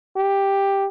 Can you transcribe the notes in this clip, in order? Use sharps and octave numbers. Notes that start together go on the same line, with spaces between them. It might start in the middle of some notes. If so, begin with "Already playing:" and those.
G4